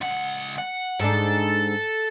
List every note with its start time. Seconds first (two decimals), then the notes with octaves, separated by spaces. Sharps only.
0.01 C#2 F#5
0.58 F#5
1.00 G#2 D4 A4